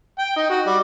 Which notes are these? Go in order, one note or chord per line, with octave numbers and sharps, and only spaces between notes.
G5
D#4
F#4
G3